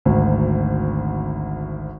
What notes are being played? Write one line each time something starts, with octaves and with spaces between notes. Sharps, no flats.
G#1 D2